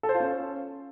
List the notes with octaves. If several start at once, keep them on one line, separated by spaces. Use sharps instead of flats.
A4
C5
F4
C#4